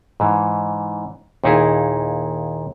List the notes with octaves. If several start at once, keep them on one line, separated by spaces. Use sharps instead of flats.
G#2 E3
D#2 A#2 D#4 E4 G#4